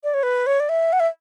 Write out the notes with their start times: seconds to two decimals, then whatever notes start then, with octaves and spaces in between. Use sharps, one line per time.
0.04 D5
0.14 C#5
0.23 B4
0.47 C#5
0.60 D5
0.69 E5
0.93 F#5
1.00 E5